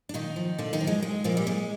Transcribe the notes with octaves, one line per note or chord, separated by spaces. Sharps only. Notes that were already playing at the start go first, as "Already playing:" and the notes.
D4
A#2 D#3 D#4
F3
A#2 D3 D4
D#3 D#4
F3
G#3
A#2 G#3
A#2 F3 A#3
G3
A#2 G#3